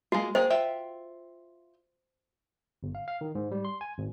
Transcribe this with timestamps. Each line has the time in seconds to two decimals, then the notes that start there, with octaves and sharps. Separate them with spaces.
0.12 G#3 A#3 F4 F#4
0.35 A#3 G#4 C5 G5
0.50 F4 E5 G5
2.83 G1
2.95 F5
3.08 F5
3.21 D#3
3.35 G#2
3.51 G3
3.65 C6
3.81 G#5
3.98 G#1